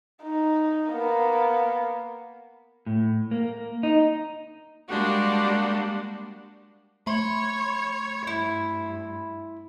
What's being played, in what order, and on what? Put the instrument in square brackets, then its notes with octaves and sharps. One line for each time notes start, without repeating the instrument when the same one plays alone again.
[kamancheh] D#4
A#3 B3
[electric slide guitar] A2
A#3
D#4
[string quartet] G3 G#3 A#3 D4 F#4 G4
[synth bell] A3 B5 C6 [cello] C#5
[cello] G2 [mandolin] E4